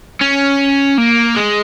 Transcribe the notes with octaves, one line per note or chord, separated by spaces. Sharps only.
C#4
A#3
G#3